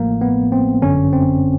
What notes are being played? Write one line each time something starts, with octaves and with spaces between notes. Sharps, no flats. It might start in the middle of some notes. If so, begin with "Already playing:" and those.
Already playing: A1 A2 F3 A3 A#3
B3
C4
G1 F#2 D3 C#4
C4